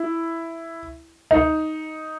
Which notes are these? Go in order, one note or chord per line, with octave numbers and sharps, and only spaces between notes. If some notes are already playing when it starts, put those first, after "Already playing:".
Already playing: E4
D#4